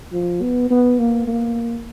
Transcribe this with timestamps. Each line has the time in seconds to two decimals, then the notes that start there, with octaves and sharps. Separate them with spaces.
0.13 F3
0.42 B3
0.70 B3
0.99 A#3
1.27 A#3